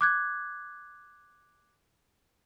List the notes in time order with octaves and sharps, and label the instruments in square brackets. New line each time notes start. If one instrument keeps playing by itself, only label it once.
[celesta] D6 F#6 G#6